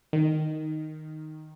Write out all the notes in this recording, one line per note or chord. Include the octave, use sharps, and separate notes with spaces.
D#3